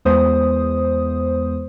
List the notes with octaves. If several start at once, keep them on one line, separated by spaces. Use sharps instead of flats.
E2 G#3 B3 C5 D#6